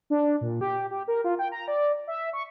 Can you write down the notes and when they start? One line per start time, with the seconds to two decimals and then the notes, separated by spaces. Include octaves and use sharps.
0.10 D4
0.41 A#2
0.61 G4
0.91 G4
1.08 A#4
1.24 F4
1.39 G5
1.52 A#5
1.68 D5
2.07 E5
2.33 C#6